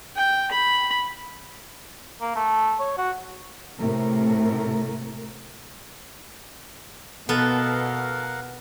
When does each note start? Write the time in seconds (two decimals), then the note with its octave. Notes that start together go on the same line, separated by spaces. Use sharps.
0.16 G5
0.52 B5
2.21 A#3
2.36 A3
2.79 C#5
2.98 F#4
3.79 A2 C3 A3 A#4
7.29 B2 B3 A4 A#4 F5 F#5